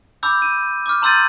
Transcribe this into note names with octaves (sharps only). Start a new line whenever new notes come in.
B5 D6 E6 G6
D#7
D6 F6
A#5 C6 E6 G6 A6 D#7